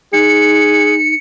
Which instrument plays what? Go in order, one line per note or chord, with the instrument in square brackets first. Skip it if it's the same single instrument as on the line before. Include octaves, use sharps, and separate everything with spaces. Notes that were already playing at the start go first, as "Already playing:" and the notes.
[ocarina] D#4 [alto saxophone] G#4 [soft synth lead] C#7